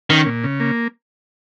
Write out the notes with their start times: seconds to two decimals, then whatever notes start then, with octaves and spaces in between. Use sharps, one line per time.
0.09 D#3 C#4
0.26 A#2
0.44 C#3
0.60 A#3